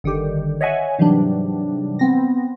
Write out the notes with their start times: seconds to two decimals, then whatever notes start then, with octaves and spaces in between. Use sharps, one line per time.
0.04 G1 D3 D#3 G4
0.61 C#5 D#5 E5 F#5 G#5
0.99 G#2 C3 E3 F#3 G3 D4
1.99 B3 C4 A#6